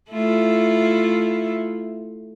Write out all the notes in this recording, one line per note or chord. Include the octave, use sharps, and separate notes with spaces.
A3 E4 F4